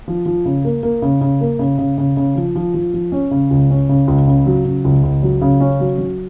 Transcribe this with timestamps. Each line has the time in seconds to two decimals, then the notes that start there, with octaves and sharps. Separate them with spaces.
0.08 F3
0.26 F3
0.45 C#3
0.65 A#3
0.83 A#3
1.02 C#3
1.21 C#3
1.41 A#3
1.59 C#3
1.78 C#3
1.98 C#3
2.17 C#3
2.35 F3
2.55 F3
2.74 F3
2.94 F3
3.12 C#4
3.31 C#3
3.50 C#2
3.70 C#4
3.89 C#3
4.07 C#2
4.27 C#3
4.46 F#3
4.65 C#3
4.84 C#2
5.03 C#2
5.23 F#3
5.42 C#3
5.60 C#4
5.80 F#3
5.98 F#3